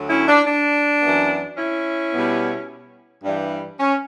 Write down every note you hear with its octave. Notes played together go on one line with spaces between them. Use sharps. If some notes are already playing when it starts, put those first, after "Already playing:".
Already playing: D2 D3 F#3
C#4 E4
D4
D4
F#2 E3 B3
C#4 E4
B2 G3 B3
G2 E3 G3
C#4